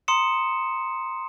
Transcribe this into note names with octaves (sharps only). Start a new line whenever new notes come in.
A#5 C6 D#6 C#7 E7